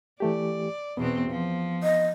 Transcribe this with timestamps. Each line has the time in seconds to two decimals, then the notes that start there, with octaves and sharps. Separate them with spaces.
0.20 E3 A3 G4 D5
0.97 E2 B2 B3 C4
1.29 F3
1.83 D#5